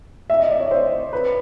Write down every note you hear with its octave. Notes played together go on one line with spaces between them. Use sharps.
E5
D#5
D5
C#5
C5
B4